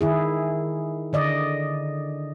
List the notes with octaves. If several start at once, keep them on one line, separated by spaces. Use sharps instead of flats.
D#3 E4 G#4
D3 D5 D#5